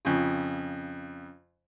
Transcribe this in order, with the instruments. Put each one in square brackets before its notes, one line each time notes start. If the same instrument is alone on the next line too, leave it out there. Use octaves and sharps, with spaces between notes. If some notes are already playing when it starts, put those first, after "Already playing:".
[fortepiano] F2 C#3